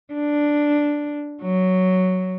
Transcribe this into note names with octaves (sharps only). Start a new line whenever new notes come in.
D4
F#3